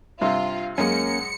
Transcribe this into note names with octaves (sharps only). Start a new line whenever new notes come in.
G2 C3 F4
F#2 G#3 A#3 C#4 C#7